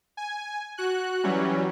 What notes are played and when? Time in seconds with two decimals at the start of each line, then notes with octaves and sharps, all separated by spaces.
0.17 G#5
0.78 F#4 F#6
1.23 E3 F#3 G3 C#4